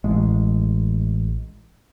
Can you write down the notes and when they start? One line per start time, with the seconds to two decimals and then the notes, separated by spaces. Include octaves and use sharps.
0.04 A1 G#3